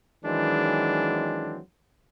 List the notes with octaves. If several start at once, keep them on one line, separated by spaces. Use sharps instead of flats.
D#3 E3 F#3 G#3 C4 D4